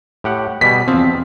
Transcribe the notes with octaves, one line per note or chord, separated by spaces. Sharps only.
A2 G4 F#5
B2 G3 G#4 B6
E2 F3 C4